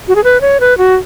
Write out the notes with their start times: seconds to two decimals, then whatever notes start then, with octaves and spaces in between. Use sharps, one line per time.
0.08 F#4
0.15 G#4
0.24 B4
0.41 C#5
0.60 B4
0.78 F#4